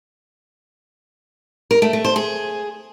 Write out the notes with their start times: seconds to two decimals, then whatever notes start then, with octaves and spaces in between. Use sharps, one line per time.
1.71 A#4
1.82 A3
1.93 A3
2.05 C5
2.16 G#4